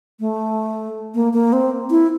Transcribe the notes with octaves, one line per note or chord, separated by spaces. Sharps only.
A3
A#3
A#3
C4
E4